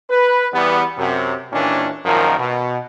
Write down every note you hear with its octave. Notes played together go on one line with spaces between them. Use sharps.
B4
E2 G3 B3
F#2 C3
D#2 A#2 D#3 E3 C#4 D4
G#1 F#2 A#2 D#3 F3 A#4
B2